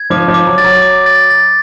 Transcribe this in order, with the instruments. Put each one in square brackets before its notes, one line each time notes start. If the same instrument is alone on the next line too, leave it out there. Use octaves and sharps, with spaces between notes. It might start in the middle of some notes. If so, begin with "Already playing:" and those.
Already playing: [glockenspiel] G#6
[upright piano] F3 [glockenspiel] D6
[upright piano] F3
[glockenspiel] D6
[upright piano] F#3
[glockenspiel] A6
[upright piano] F#3
[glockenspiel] D6
A6
A6